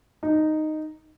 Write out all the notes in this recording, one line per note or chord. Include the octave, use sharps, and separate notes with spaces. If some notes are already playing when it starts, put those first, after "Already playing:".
D#4